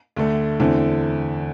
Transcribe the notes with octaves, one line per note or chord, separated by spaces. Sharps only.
D2 D3 A3
E2 D3 A3 C4